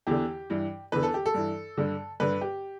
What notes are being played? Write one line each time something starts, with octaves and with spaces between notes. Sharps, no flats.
E2 D3 G4
G2 E3
E2 D3 B4
A4
G4
A4
G2 E3
G2 D3
G2 D3 B4
G4